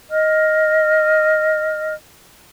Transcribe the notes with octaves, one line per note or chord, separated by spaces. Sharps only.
D#5 F6